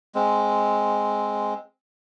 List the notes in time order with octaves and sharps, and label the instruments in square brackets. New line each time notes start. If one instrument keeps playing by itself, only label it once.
[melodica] G#3 C4